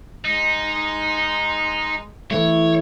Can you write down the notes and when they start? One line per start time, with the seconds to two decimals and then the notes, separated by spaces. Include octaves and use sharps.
0.25 G#3 D#4
2.31 E3 A3 C#5